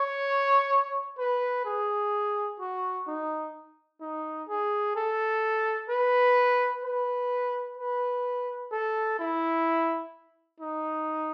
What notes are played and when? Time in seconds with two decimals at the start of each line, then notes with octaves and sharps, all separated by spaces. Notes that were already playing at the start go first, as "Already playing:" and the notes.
Already playing: C#5
1.18 B4
1.65 G#4
2.60 F#4
3.07 D#4
4.01 D#4
4.48 G#4
4.96 A4
5.90 B4
6.84 B4
7.77 B4
8.72 A4
9.19 E4
10.60 D#4